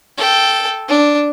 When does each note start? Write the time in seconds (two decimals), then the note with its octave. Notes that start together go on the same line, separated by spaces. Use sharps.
0.18 A4 G5
0.89 D4